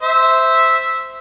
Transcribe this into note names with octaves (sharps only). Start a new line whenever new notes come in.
C5 E5